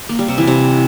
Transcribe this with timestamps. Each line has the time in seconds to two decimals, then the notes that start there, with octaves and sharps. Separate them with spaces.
0.09 A#3
0.19 G3
0.28 C3
0.38 E3
0.47 C3